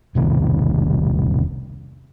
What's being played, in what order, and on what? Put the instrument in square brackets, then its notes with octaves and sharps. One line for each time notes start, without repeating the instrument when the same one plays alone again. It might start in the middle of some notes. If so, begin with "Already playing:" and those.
[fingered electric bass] E1 C2 D#3